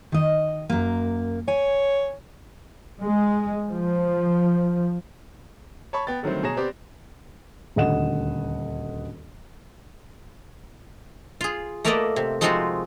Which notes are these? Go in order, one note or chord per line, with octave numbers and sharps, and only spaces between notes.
D#3 D#5
F#2 A#3
C#5 G#5
G#3
F3
C#5 A5 B5 C#6
B3 G5 A6
D3 D#3 F#3 G3 A3 C4
B2 G#4 C#5 A#5 A#6 E7
B3 C4 G4 D5
D#1 D2 A4 D#5 F#5 E7
F4 G#4
A3 A#3 A#4 B4 D5 D#5
C3
F3 G#3 C4 D#4 F4 F#4